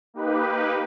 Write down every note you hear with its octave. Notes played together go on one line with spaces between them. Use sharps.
A#3 D#4 G4 B4